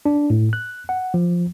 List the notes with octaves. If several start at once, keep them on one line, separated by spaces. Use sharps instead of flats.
D4
A2
F#6
F#5
F3